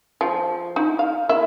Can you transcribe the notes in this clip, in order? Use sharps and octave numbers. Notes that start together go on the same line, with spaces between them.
F3
D#4 E4
F5
A#3 E4 E5